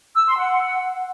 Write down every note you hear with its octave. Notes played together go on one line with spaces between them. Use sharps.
E6
C6
F#5